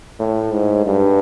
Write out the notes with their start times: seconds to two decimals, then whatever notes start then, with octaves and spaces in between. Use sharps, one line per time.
0.20 A2
0.52 G#2
0.86 G2